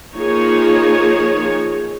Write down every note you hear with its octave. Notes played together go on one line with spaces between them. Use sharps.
F3 A#3 D#4 G#4 C#5